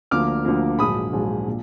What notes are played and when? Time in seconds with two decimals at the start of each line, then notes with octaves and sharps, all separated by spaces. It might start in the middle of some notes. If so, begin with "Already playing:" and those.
0.11 D2 D3 F3 A#3 D6 F6
0.45 D2 D3 F3 A#3
0.79 A#1 G#2 F#3 B5 D#6
1.13 A#1 G#2 F#3
1.47 A#2